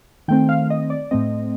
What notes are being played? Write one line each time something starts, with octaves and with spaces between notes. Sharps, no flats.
D#3 A3 C4 G5
F5
D#5
D5
A2 A3 C4 D#5